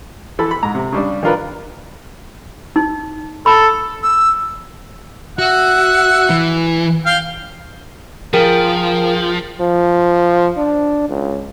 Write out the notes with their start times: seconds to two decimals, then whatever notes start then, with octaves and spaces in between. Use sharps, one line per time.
0.39 E3 A4 B5
0.51 B5
0.63 G#2 A#5
0.75 C3
0.92 C#3 G3 D4
1.23 D#3 D4 F4 A#4 B4
2.76 D#4
3.46 A4 B5
4.03 E6
5.39 F#4 E5 F#5
6.30 E3
7.06 F5 G5
8.33 F3 G#4 A#4 G5
9.60 F3
10.57 D4
11.09 C#2